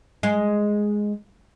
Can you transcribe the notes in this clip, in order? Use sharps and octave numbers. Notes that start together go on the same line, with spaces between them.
G#3